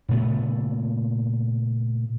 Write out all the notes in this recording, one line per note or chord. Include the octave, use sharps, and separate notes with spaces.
A#2 C#3 A3 B3